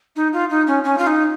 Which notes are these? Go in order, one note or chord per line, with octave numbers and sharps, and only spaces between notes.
D#4
F4
D#4
C#4
C#4
F4
D#4